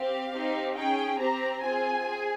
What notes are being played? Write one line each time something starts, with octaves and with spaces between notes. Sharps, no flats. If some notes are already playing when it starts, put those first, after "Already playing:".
Already playing: C4 G4 F5
C4 D#4 G4
C#4 G#4 G5
C4 G4 A#5
C4 F4 G#4 G#5
G#4